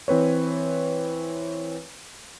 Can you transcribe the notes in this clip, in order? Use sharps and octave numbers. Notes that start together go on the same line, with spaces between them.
E3 C4 B4 C#5